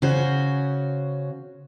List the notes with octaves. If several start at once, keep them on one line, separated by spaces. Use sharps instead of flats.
C#3 C#4 F#4 C5